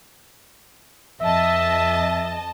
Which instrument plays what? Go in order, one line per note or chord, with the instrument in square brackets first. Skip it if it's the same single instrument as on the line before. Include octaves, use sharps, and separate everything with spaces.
[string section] F2 D#5 A5 [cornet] E5